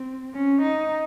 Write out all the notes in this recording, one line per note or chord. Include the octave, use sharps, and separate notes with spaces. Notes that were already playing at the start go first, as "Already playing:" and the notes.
Already playing: C4
C#4
D#4